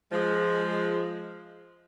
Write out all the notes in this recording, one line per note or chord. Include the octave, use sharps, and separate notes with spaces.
F3 G#3